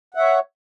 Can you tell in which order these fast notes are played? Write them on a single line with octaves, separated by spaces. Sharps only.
F#5 E5 C#5